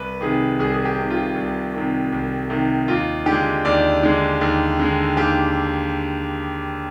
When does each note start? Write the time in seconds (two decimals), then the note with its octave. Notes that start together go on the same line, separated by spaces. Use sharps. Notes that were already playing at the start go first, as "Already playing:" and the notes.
Already playing: C2 B4
0.21 C3 D#3 G#4
0.59 C2 G#4
0.73 G#4
0.85 G4
0.98 C3 D#3
1.10 F4
1.36 C2
1.74 C3 D#3
2.13 C2
2.50 C3 D#3
2.88 D#2 F4
3.26 D3 G#3 G4
3.65 D#2 D5
4.03 D3 G#3
4.41 D#2
4.80 D3 G#3
5.17 D#2 G4